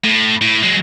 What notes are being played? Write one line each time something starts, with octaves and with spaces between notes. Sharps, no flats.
A2
A2
F#3 G#3